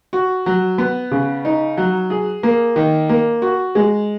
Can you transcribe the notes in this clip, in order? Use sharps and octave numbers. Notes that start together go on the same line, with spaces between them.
F#4
F#3
B3
C#3
D#4
F#3
G#4
A#3
D#3
A#3
F#4
G#3